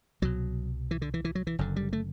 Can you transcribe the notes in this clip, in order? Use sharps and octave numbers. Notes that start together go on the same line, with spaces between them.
C2 B2 F#3
E3
D3
E3
E3
F#3
E3
F#1 F#2 D3
G3
A3